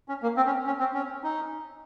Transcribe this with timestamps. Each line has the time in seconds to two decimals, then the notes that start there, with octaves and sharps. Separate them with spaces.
0.09 C#4
0.22 A#3
0.37 C4
0.46 C#4
0.66 C#4
0.80 C4
0.94 C#4
1.23 D#4